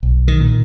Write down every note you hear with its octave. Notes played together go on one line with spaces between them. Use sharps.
B1
D#3
A#2